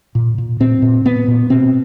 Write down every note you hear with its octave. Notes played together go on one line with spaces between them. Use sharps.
A#2
A#2
A#2 C4
A#2
A#2 B3
A#2
B2 C4